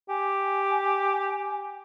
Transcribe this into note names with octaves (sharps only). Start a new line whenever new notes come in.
G4 G#5